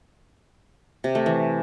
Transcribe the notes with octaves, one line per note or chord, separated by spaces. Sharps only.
C3
A3
E3